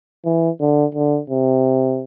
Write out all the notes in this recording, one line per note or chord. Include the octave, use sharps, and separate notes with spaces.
E3
D3
D3
C3